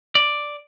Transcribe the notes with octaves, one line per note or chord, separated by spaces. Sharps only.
D5